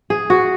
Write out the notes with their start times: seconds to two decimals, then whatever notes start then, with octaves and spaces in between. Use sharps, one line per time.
0.10 G#4
0.30 F#4